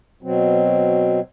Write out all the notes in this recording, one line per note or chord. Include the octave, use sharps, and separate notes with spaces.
B2 F#3 C4